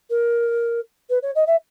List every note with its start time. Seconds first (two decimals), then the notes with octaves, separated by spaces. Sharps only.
0.10 A#4
1.10 B4
1.22 C#5
1.35 D#5
1.47 E5